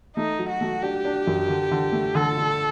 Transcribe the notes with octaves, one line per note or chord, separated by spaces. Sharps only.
A3 D#4
F#3
F#4
A3
D4 G4
D4
F#2
D3
D3
A3
D3 A4
D3